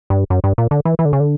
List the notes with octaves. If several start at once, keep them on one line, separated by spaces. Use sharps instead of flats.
G2
F#2
G2
A#2
D3
E3
E3
D3
C#3
D3